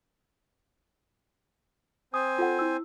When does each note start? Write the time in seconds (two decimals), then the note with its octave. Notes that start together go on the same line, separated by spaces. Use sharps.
2.14 C4 C5 G#5 D#6
2.39 F4 A4 F#5
2.59 E4 E6